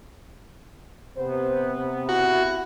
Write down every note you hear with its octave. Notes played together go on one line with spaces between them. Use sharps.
C3 B3 C5
E4 F#4